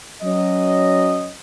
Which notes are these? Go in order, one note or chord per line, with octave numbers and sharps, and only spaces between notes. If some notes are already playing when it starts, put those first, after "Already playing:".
F#3 C#4 D#5